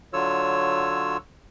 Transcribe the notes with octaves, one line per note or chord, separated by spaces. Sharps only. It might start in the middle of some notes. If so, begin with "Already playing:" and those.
D3 F#3 F4 C#5 E6